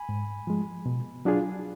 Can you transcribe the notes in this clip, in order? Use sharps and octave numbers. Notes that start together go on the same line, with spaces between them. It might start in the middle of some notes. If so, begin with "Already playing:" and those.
Already playing: G#5 B5
G#2
F3 G#3
B2
F#3 D4 F4 G#4